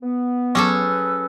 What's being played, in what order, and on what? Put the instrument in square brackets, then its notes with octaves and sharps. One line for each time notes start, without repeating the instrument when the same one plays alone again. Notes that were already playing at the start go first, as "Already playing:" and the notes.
[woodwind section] B3
[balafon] F#3 D6 [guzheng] C#4 G#4 A4 [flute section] B4 E6